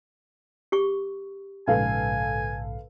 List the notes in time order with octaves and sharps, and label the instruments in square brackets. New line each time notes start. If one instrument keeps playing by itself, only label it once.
[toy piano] G4 G#4 C#6
[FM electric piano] A#1 G#2 C#3 [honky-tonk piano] A4 B4 F5 [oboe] G#5